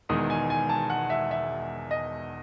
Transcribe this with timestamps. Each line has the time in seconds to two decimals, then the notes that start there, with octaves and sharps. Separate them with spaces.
0.09 E1 E2 D#3 G#3 D#6
0.30 G#5
0.50 G#5
0.69 A5
0.90 F#5
1.10 E5
1.31 E5
1.91 D#5